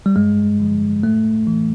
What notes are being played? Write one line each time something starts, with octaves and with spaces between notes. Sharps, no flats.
G3
G2 G#3
D3 F3
A2 A3
E3